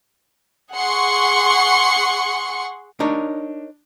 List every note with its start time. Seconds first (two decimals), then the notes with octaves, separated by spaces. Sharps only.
0.74 G#4 F#5 C6 C#6 C#7
3.00 D4 D#4 A#4 C#5